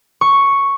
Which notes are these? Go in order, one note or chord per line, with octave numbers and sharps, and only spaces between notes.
C#6